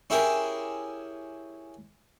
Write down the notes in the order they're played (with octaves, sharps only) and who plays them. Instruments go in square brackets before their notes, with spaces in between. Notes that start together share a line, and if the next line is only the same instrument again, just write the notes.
[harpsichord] C#4 E4 G4 G#4 A#4